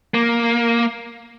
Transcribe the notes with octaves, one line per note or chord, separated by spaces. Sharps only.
A#3